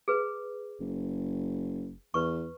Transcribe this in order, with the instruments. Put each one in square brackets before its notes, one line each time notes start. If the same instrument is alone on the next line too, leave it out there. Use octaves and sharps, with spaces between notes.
[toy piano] G#4 B4
[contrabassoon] F#1
[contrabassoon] E2 [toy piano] B4 C#6